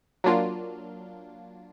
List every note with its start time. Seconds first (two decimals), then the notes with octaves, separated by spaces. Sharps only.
0.24 F#3 A#3 D4 F4